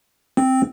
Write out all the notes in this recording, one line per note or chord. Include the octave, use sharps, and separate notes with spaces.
C4